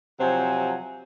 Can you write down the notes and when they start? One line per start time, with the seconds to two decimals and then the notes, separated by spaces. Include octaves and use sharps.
0.20 C3 F3 F#3 C5 G#5